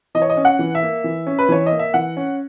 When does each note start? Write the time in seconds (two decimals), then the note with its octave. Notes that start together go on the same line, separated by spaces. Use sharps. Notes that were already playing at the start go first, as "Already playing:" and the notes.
0.15 E3 D#5
0.22 C#5
0.30 D#5
0.37 C#4
0.45 F#5
0.59 E3
0.75 E5
0.82 A#3
1.04 E3
1.27 C#4
1.39 B4
1.49 E3 C#5
1.66 A#3 D#5
1.79 E5
1.94 E3 F#5
2.17 C#4